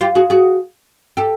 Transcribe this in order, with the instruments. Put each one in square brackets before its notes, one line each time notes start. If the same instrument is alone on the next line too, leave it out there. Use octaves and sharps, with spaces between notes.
[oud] F4 G4
F#4 G#4
F#4 G#4
G4 A4